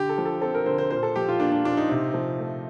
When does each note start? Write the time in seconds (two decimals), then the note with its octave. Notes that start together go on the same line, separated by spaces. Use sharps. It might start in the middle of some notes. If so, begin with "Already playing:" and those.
Already playing: D3 G4
0.09 A4
0.18 F3
0.26 A4
0.41 C4 A4
0.55 A#4
0.66 D3 C5
0.78 C5
0.91 A#2 C5
1.03 A4
1.16 F3 G4
1.29 F4
1.40 A#3 D4
1.52 D4
1.65 A#2 D4
1.77 D#4
1.89 C3
2.14 F3
2.39 A3